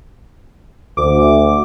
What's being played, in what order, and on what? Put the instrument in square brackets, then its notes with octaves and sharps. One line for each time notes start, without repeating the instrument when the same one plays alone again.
[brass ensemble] D2 [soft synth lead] D6